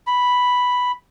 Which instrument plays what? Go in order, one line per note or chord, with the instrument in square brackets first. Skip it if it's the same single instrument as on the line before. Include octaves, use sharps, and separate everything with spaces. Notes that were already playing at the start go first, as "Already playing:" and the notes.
[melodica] B5